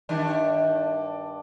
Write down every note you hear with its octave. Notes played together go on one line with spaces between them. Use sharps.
G2 D#3 D4